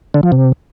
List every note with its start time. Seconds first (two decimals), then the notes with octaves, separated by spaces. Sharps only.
0.14 D3
0.23 F3
0.32 C3